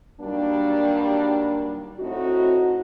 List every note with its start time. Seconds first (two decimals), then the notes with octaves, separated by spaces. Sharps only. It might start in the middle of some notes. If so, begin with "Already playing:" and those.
0.21 G2 D#3 F#3 G3 A#3 D4
1.99 A2 C4 D#4 F#4